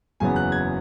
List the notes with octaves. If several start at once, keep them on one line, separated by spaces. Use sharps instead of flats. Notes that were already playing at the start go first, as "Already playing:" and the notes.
F#1 E2 C#3 F#3 B3 G#5
F#6
G#6